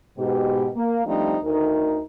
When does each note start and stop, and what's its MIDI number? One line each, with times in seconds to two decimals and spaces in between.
0.18 0.69 44
0.18 0.69 47
0.18 0.69 67
0.75 1.02 58
1.05 1.36 53
1.05 1.36 55
1.05 1.36 57
1.05 1.36 60
1.05 1.36 62
1.05 1.36 63
1.43 2.01 38
1.43 2.01 63
1.43 2.01 70